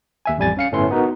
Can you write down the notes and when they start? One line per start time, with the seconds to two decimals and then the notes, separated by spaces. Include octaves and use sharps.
0.26 D#2 E5 G#5
0.37 A1 F2 G3 G#5 A6
0.57 C#4 F5 C#7
0.72 G1 A2 A3 C#4 B4 C6
0.91 B3 D#4 F#4 A#4